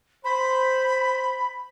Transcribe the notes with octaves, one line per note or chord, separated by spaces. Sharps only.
C5 B5